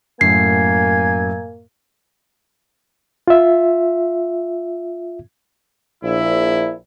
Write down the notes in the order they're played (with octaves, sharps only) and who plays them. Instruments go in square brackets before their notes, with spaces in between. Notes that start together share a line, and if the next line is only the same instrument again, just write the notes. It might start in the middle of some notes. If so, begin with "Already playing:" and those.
[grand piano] F#2 A2 [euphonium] A#3 [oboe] G#5 [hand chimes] C7
[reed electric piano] F4 E5
[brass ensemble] A#1 E4